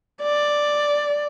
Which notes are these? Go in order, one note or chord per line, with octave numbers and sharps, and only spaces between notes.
D5